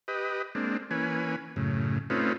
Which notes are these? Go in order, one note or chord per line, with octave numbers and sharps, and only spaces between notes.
G4 B4 D#5
G#3 A#3 C4 D4
E3 A#3 C#4 B4 G#5
F#2 A2 C#3
A3 C4 C#4 D#4 F4 B4